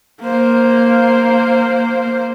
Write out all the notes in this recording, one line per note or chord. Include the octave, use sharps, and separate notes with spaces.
A#3 C5